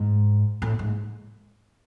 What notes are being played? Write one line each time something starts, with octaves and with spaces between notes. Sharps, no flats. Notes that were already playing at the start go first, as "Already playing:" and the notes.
Already playing: G#2
A2
G#2